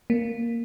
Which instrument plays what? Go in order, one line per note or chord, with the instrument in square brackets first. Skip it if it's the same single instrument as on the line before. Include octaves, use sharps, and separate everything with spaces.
[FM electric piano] A#3